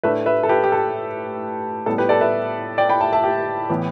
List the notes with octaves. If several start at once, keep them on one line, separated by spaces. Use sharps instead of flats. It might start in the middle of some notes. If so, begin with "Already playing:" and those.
A2 A3 D4 B4 E5
B4 E5
A4
G4 B4
G4
A4
A2 G3 B3 A4
G4 B4
A4 D5
B4 E5
D5 G5
G5 B5
E5 A5
E5 A5
G4
A2 E3 B3 E4